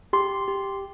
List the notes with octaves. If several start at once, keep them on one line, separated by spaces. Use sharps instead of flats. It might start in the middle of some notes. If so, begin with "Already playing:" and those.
G4 C6
G4